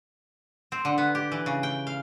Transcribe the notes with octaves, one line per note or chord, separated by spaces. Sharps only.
C4
D3
B3
G4
E3
C#3
G5
F5